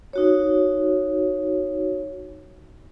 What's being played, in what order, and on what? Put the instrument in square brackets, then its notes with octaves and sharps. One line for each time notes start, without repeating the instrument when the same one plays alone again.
[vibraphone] D#4 F#4 C#5